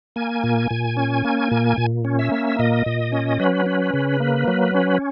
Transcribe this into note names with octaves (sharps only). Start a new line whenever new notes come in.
A#3 G#5
A#2
A#2
C#4
A#3
A#2
A#2
C#4
E5
A#3
A#2 D#5
A#2
C#4
F#3 B4
C#4
C#3
A#3
F#3
C#4